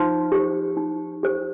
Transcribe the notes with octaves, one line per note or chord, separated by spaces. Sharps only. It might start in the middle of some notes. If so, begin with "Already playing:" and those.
Already playing: F3 D#4
G4 C5
D#4
G4 C5